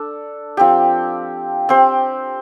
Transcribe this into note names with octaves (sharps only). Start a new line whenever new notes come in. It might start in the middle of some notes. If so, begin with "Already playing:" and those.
Already playing: D4 A4
F3 C4 G4
C4 G4 C5